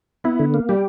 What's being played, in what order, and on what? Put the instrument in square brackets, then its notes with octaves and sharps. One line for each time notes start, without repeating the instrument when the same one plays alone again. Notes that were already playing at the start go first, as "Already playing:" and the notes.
[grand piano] B3 [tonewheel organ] E4
[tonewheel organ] D3
A#3
[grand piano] G3 [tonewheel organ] G4